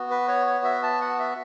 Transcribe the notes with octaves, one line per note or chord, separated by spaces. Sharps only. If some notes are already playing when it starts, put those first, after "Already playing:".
Already playing: B3 F#4
B4
C#5
C#5
E5
A5
F#5
E5